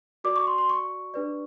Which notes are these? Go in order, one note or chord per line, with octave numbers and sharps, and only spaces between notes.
F#4 A#4 D5 D6
C#6
C6
C6
C#6
D4 G4 B4 D5